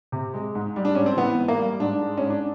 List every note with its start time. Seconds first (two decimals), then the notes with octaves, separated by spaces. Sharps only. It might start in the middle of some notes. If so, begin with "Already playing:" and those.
0.12 C3
0.34 G#3
0.55 G#2
0.76 G3
0.85 D4
0.95 G#2 C#4
1.06 C4
1.17 E3 B3
1.38 G#2
1.48 A#3
1.60 G3
1.80 G#2 D4
2.01 G#3
2.18 G#2 C#4
2.30 D4